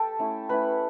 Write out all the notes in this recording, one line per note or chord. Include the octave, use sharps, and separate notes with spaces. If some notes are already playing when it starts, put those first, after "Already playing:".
Already playing: G4 A4 G5 A5
A3 C#4 E4
A3 C#4 E4 B4 B5